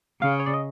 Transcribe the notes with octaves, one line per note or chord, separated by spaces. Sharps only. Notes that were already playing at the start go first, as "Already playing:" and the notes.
C#3 F5
C#5
D5
D#5